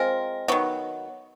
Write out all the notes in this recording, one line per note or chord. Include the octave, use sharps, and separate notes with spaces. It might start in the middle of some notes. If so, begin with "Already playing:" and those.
Already playing: G#3 C4 F4 A#4
D#3 F#3 B3